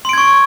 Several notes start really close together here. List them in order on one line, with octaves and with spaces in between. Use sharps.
C6 D7 G#6 C#6